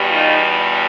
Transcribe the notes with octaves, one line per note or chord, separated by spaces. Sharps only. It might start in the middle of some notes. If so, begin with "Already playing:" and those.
Already playing: E2 B2 G3
D#4 F4